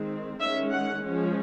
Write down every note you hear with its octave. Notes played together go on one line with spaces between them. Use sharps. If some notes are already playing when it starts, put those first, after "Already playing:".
Already playing: D#3 G#3 C4
D#3 G#3 C#4 E5
F#5
F3 G#3 C#4